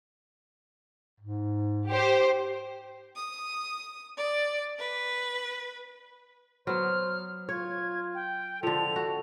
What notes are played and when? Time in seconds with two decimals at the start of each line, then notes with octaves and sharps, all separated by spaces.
1.20 G#2
1.89 G4 C5
3.16 D#6
4.18 D5
4.78 B4
6.67 F#3 B3 C5 F6
7.49 F4 C#5 G#6
8.15 G5
8.63 D3 F3 A4 F7
8.96 F#4